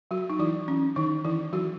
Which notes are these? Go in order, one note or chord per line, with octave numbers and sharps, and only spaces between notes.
F#3 F#4
D#4
E3 E4
C#4
D#3 D#4
E3 E4
F#3 F#4